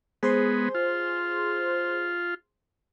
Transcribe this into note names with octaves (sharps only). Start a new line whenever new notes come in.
G#3 B3 G#4 C5 C6
F4